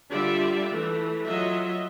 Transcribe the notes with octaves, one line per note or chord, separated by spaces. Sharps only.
D3 G3 F4 D5 E5
E3 A3
F#3 F4 D#5 E5